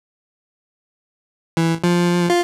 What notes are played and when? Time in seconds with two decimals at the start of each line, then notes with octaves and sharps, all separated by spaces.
1.57 E3
1.84 F3
2.30 F4